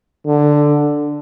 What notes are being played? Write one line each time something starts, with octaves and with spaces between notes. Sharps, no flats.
D3